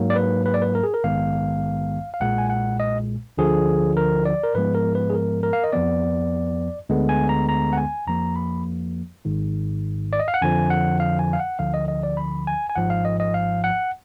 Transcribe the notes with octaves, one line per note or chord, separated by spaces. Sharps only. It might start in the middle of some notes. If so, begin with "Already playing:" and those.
Already playing: G#2 F#3 A#3
D5
B4
B4
D5
B4
A#4
G#4
A#4
A#1 G#2 D#3 G#3 B3 F5
F5
B1 A#2 G#3 F#5
G#5
F#5
D#5
D2 D3 F3 G#4
A#4
D5
A#4
G#2 F3 G#3 B3 B4
A#4
B4
G#4
A#4
A#4
F5
D#5
F2 F3 B3 D5
D2 D3 G#3 B3
G#5
A#5
A#5
F#5
G#5
F2 F3 A#3 A#5
B5
G#1 G#2 D#3
D5
D#5
F5
F#5
F2 D3 F3 G#5
F#5
F5
G#5
F5
F#5
D2 D3 F3 F5
D#5
D#5
D5
B5
G#5
G#5
G#1 G#2 F3 F#5
F5
D#5
D#5
F5
F#5